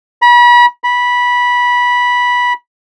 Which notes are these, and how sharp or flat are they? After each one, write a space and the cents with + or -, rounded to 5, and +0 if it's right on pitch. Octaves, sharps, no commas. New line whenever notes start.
B5 -35
B5 -15